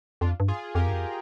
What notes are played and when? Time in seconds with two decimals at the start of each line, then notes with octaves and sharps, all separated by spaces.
0.21 F2 D4 F4
0.40 G2
0.48 F4 G#4
0.75 F2 G4 A#4
0.88 G2
0.93 F2